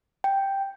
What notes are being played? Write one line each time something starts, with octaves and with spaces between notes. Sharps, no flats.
G5